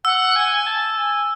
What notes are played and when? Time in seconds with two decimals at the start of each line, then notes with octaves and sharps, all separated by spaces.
0.05 F#5 E6
0.36 G#5
0.66 A5
0.97 G#5